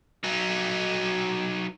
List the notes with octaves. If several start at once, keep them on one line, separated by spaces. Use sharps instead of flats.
F#3 D#4